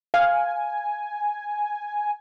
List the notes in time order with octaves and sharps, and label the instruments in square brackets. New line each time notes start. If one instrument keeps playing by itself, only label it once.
[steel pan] F5 [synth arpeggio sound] G#5